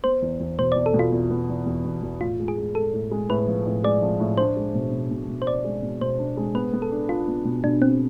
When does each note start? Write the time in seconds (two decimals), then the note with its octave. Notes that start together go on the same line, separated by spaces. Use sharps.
0.04 B3 C5
0.22 E2
0.40 E2
0.59 B2 C5
0.72 E2 D5
0.86 A4
0.94 B2
0.99 F4
1.13 E2
1.30 B3
1.49 E2
1.66 E2
1.85 E2
2.02 E2
2.20 A2 F4
2.40 G#3
2.48 G#4
2.58 G#3
2.75 G#3 A4
2.93 A2
3.11 G#3
3.29 A2 B4
3.48 F3
3.66 A2
3.84 G#3 D5
4.02 F3
4.20 A2
4.38 D4 C5
4.57 G#3
4.75 B2
4.92 B2
5.11 B2
5.29 B2
5.42 C5
5.47 D4 D5
5.64 G#3
5.83 B2
6.01 B2 C5
6.18 D4
6.37 G#3
6.55 B3 B4
6.73 B3
6.82 A4
6.92 D4
7.09 D4 F4
7.28 B3
7.45 B2
7.64 B2 D4
7.82 B2 C4